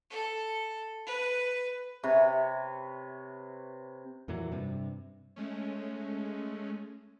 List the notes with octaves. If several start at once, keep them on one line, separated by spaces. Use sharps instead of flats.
A4
B4
C3 B4 C#5
F2 A#2 E3 F#3
G2 C3
G#3 A3 C#4